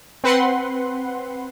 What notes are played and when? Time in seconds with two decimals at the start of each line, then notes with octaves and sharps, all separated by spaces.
0.24 C4 B4 F#5 C6